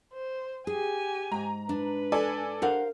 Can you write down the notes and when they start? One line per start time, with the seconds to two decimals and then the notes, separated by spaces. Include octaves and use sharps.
0.13 C5
0.67 G4 G#4 G#5
1.32 G#2 A#5
1.69 D4 B4
2.12 A4 D5 G#5
2.62 D4 G4 A#4 C5 F5 F#5